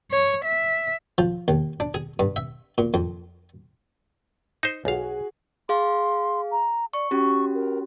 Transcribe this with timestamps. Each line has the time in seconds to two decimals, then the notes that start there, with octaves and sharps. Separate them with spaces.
0.11 C#5
0.44 E5
1.18 F3
1.48 D#2
1.80 D4
1.94 G#4
2.19 G2
2.36 E5
2.78 A#2
2.94 F2
4.63 D#4 C5
4.85 B1 F#4 G#4 F5
5.69 G#4 F5 C6
6.52 A#5
6.93 D5 C#6
7.11 C#4 F#4 G4 C#6
7.55 A#4